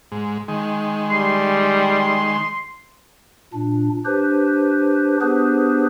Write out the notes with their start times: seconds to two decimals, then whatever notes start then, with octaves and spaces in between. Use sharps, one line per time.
0.12 G#2
0.48 D#3 G#3
1.10 G3 C6
3.54 A#2 D4
4.05 D4 G4 B4 C5
5.21 B3 D4 G4 G#4 B4 C5